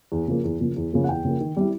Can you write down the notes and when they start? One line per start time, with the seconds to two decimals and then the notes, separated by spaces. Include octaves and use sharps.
0.12 E2
0.28 C#3 F3 A#3
0.44 E2
0.60 C#3 F3 A#3
0.77 E2
0.92 C#3 F3 A#3
1.04 F#5
1.09 E2 G5
1.25 C#3 F3 A#3
1.41 D#3
1.57 G3 C4 E4